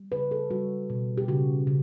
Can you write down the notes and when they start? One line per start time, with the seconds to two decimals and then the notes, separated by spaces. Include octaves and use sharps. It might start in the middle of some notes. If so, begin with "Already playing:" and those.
Already playing: G3
0.12 C#3 B4
0.31 A4
0.51 G3 F#4
0.90 B2
1.18 G4
1.28 C#3 F#4
1.67 C#3